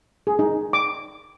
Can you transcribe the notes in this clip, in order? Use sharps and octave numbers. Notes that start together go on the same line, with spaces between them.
G#4
D#4
D6